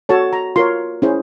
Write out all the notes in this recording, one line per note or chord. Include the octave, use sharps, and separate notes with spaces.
F#4 A4 C#5 A5
A#5
F4 A#4 C#5 C6
C#4 E4 G#4 C5